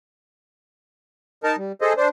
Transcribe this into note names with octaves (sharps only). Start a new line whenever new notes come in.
D#4 A#4 A5
G3
G#4 A4 C5 D#5
D4 C5